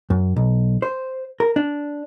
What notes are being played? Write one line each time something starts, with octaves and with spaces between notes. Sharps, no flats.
F#2
B1
C5
A#4
D4